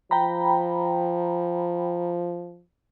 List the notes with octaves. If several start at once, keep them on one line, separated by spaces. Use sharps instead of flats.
F3 G5 A#5 B5